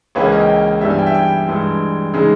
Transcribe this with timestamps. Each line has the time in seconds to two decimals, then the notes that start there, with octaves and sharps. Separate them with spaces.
0.15 C#2 C#3 E3 A#3 C#4 B4
0.24 C#5
0.32 D#5
0.41 G5
0.81 G2 E3 G3 B3 E5
0.90 G#5
0.99 G5
1.06 E5
1.14 G5
1.48 G2 E3 G#3
2.14 C#3 E3 G#3 D#4